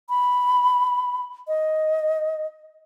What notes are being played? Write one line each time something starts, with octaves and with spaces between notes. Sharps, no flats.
B5
D#5